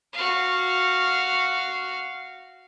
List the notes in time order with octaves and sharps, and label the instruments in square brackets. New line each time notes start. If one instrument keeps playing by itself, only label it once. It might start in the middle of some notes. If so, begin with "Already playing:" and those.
[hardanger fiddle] F#4 F5